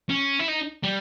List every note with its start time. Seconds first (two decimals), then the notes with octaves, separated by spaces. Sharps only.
0.09 C#4
0.40 E4
0.49 D#4
0.84 G3